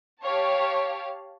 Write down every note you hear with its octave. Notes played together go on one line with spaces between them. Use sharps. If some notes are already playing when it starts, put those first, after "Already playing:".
G4 C#5 F5 A5